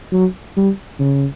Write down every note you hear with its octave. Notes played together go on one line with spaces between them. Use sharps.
F#3
G3
C#3